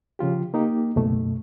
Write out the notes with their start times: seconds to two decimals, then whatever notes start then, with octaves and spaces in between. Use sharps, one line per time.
0.19 C#3 F3 F4 G4
0.54 A#3 D#4 G4
0.96 C#2 F#2 B2 A3